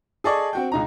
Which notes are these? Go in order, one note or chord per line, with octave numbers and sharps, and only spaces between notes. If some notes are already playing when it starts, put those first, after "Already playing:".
G#4 A4 D5 D#5 C#6
C4 F#4 G5
C#2 D#4 A#5